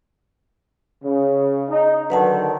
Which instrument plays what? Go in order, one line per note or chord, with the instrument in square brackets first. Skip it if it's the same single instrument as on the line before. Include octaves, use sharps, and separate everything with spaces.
[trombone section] C#3
D#4
[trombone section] D3 D#3 F#3 [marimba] B4 F#5 A5